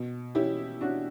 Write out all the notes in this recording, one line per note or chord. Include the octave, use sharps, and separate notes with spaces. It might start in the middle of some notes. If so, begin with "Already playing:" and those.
Already playing: B2
C#4 E4 G4
C#4 D4 F#4